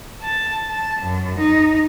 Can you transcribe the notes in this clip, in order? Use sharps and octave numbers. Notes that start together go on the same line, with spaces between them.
A5
A5
F#2
D#4